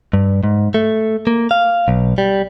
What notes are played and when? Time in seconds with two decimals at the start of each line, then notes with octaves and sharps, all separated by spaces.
0.13 G2
0.44 G#2
0.74 A3
1.27 A#3
1.51 F5
1.88 B1
2.18 G3